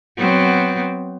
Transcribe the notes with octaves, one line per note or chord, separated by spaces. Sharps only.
F#3 B3 C4